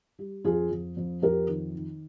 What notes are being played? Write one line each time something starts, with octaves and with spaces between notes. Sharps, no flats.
G3
F2 F4 G#4
F2
F2
F2 G4 A#4
D#3
D#3